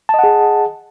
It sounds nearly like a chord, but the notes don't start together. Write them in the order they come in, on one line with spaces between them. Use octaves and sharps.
A5 D#5 F#5 G#4